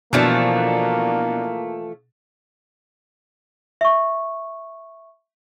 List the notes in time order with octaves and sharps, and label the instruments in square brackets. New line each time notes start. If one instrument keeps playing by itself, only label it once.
[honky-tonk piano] B2 D4 [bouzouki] E3 F3 A3 [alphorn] A#3
[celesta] E5 C#6